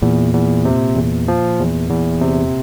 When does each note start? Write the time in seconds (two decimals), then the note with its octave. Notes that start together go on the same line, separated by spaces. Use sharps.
0.02 E2 A#2
0.33 E2
0.65 C3
0.96 E2
1.28 F3
1.60 E2
1.90 E2
2.21 C3